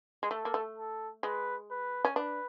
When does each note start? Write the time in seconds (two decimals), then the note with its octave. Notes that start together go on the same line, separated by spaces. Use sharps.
0.23 G#3
0.31 A3 A4
0.45 A#3
0.54 A3
0.78 A4
1.23 G#3 B4
1.71 B4
2.05 C#4
2.16 D4 B4